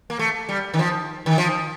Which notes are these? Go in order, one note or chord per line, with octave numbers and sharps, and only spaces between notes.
A#3
A3
G3
D#3
F3
D#3
F3